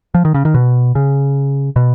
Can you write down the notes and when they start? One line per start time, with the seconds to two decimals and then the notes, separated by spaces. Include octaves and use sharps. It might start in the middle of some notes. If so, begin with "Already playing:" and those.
0.14 F3
0.25 D#3
0.34 C#3
0.45 D#3
0.54 B2
0.95 C#3
1.76 B2